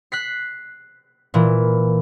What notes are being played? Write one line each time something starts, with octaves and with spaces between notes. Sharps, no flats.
F#6 B6 C7
A#2 E3